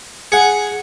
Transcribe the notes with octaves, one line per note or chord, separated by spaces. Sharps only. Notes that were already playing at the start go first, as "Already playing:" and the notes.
G#4 F#5 C#7